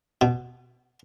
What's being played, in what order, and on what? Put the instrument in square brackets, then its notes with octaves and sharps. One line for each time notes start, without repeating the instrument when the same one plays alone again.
[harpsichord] B2